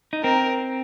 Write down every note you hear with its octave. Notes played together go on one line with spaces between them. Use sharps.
D#4
C4 A#4